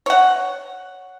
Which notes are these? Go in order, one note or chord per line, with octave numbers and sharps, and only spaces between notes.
C#5 F#5